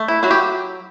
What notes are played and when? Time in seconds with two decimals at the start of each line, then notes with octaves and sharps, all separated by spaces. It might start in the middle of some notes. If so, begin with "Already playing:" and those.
Already playing: A3
0.08 E4
0.23 F#3 E4 F#4
0.31 G4